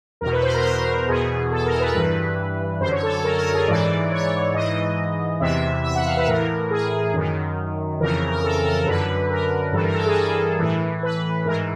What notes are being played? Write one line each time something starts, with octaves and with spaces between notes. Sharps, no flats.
E2 B2 A#4
B4
C5
A#4
A#4
E2 B2 G#4
A4
A#4
B4
G2 E3
F#2 D3 C5
C#5
A4
A4
A#4
A#4
G#4
G#2 E3 D5
C#5
G#2 E3 D#5
E2 C3 E3 E5
E5
F#5
F5
B4
A2 E3 A#4
G#4
F#2 D#3
F2 C#3 E3 A#4
A#4
A4
A#4
F#2 D3 B4
A#4
G2 E3 A4
A#4
A4
G#4
A4
A2 E3
B4
G#2 E3 A#4